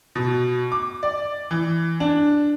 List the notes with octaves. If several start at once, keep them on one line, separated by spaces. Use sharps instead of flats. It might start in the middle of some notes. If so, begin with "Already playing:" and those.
B2
D6
D5
E3
D4